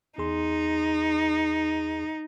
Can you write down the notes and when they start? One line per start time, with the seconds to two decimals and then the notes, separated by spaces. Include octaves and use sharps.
0.18 E2 D#4 G#4 C6